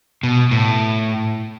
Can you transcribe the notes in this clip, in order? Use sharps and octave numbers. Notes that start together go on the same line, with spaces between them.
B2
A2